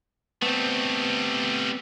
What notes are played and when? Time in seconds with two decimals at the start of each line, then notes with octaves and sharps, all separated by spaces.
0.42 G3 A3 B3 C4